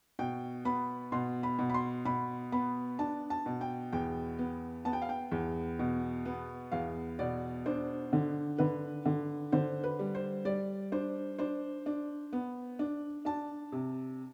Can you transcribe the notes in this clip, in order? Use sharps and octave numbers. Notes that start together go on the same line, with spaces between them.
B2 G5
B3 B5
B2 C6
B5
B2
B5
C6
B2 B5
B3 B5
D4 A5
A5
B2
G5
E2 G5
B3
B3 A5
G5
F5
G5
E2
B2
B3
E2 F5
B2 D5
D4 C5
D3
D3 B4
D3
D3 C5
B4
G3
C5
G3 D5
D4 C5
D4 C5
D4
B3
D4
D4 A5
C3